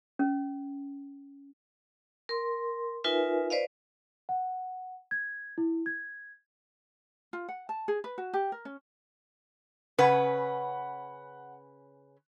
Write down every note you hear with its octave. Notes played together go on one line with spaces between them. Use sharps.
C#4
A#4 C6
D#4 F4 A#4 B4 E5 G#5
B4 C5 D5 D#5 F5
F#5
G#6
E4
G#6
F4
F#5
A5
G#4
B4
F#4
G4
A#4
C#4
C#3 C#4 B4 F#5